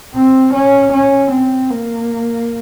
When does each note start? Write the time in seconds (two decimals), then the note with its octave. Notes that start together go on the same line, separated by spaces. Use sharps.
0.15 C4
0.55 C#4
0.93 C#4
1.32 C4
1.70 A#3